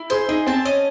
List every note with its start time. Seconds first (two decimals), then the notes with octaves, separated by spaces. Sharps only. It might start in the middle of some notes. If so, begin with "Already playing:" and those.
Already playing: E4
0.10 G#4 C5
0.29 D#4 G#4
0.47 C4 A5
0.65 C#4 D#5